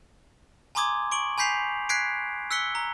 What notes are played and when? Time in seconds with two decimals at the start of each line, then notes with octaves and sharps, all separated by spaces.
0.75 G#5 A#5 C6 D6 D#6 G#6
1.12 C#6 D7 F#7
1.38 G#5 B5 G6 B6 C7 F7
1.89 F#6 G#6 B6 C7 D7
2.51 E6 F#6 B6 C#7 G7
2.75 A#5